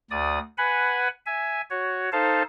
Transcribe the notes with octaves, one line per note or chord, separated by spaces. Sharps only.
D2 D5 D#6
B4 F#5 G#5 B5
E5 G#5
F#4 C#5
D#4 A4 C5 F5 A5